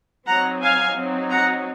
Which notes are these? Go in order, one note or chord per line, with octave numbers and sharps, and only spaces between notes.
F#3 C4 D#4 F#5 A#5
F5 G#5
F#3 C4 D#4
F#5 A#5